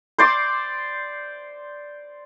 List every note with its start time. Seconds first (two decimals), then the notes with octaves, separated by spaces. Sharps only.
0.18 C5 D5 C6 D6